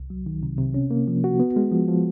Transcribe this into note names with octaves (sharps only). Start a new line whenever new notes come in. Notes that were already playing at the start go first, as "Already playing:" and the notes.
Already playing: C2
F#3
D#3
C3
C3
C#4
A#3
F3
F#4
B3
G#3
F3
F3